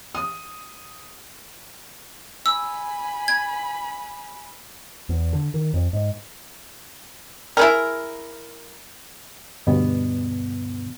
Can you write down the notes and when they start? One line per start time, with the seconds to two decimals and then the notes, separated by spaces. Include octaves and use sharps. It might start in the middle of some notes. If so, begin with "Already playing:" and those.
0.15 D#6
2.46 G#5 B5 E6
3.28 G#6
5.09 E2
5.33 D3
5.54 D#3
5.73 F2
5.93 G#2
7.57 E4 G#4 A#4
9.67 D2 G2 B2 B3